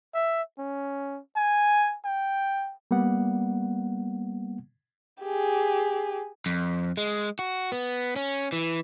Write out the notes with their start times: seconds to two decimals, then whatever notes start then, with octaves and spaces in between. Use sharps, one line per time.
0.14 E5
0.59 C#4
1.36 G#5
2.05 G5
2.91 G3 A#3 B3 F#5
5.22 G4 G#4
6.46 F2
6.97 G#3
7.39 F#4
7.72 B3
8.16 C#4
8.52 E3